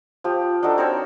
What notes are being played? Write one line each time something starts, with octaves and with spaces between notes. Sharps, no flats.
F3 G4
D4 D#4 F#4 A4
C4 A#4 C#5 E6